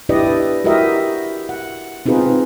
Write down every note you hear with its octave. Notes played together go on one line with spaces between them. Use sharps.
D4 E4 G4 B4 D5 D#5
E4 F#4 G4 A#4 D#5 E5
F#5
C4 D#4 F4 G#4 B4